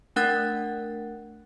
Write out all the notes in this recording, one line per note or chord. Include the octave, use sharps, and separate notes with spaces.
A3 D4 A#4 F#5 F#6 A6